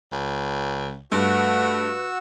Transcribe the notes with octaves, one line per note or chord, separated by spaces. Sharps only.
C#2
G2 A3 F#4 B4 F#5 E6